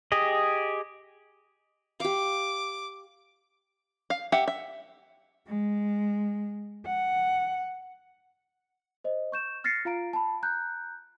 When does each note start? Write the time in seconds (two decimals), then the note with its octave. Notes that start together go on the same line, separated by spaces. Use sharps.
0.12 G4 G#4 D#5
2.00 G4 F5 D6
4.10 F5
4.32 G4 E5 F#5
4.48 E5
5.47 G#3
6.86 F#5
9.04 C5 D#5
9.32 C#6 G6 E7
9.64 F6 A6 A#6 C7 C#7
9.85 F4 F5 A#5 D7
10.13 A5 B5
10.43 A#5 F#6 G6